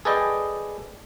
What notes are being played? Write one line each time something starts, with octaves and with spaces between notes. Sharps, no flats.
G#4 A4 B4 D5 D#5 G5